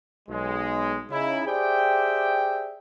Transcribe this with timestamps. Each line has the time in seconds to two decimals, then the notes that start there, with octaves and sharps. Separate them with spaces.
0.29 B1 G#3
1.11 C#3 D#4 E4
1.46 G4 G#4 C5 D5 E5 G5